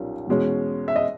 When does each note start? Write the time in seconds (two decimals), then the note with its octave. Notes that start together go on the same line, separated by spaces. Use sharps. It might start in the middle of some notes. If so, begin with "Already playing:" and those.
Already playing: B1 A#2 G3 A#3 C#4
0.27 E2 B2 G#3 C#4
0.88 E5
0.96 D#5